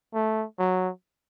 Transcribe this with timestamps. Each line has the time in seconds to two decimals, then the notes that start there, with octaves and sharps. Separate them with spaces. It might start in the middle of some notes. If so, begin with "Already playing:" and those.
0.14 A3
0.59 F#3